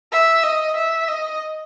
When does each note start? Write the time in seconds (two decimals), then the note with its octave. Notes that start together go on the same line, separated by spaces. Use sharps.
0.12 E5
0.43 D#5
0.76 E5
1.08 D#5